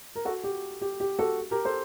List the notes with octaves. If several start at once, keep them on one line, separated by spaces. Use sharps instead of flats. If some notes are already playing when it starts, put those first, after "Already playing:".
A#4
F#4 A4
G4
G4
G4
F#4 A4
G4 A#4
A4 C5